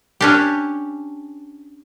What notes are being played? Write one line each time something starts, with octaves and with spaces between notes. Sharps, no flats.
C#4 D4 G4